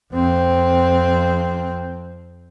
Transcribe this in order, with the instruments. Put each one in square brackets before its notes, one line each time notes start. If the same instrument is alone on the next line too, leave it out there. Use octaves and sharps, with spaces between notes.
[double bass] F2 C4